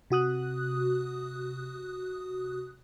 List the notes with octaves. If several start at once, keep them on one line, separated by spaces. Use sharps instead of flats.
C3 F#4 D#6 F#6